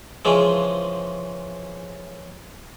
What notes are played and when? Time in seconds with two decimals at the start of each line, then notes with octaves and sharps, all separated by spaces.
0.25 C#3 E3 F3 G#3